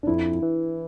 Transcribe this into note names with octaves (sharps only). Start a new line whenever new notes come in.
D4
F2 E4
E3